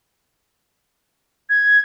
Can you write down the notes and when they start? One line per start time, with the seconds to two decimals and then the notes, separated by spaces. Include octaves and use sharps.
1.50 G#6